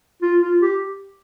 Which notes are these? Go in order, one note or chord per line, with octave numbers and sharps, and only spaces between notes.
F4
F4
G4